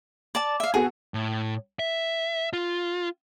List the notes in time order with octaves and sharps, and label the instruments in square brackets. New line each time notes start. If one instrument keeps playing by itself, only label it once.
[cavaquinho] D5 A5
E5 F5
[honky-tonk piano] B3 F#4 A4 [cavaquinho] G#4
[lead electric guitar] A2
E5
F4